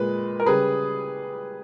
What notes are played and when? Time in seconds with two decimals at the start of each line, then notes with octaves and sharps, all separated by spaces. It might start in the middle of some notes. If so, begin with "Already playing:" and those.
Already playing: A#2 G#3 B4
0.40 A#4
0.46 C#3 G3 G#4 B4